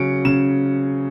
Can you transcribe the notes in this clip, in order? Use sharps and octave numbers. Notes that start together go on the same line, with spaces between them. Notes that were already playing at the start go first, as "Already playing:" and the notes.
Already playing: C#3 F#3 C#4 C#7 D7
C#3 E7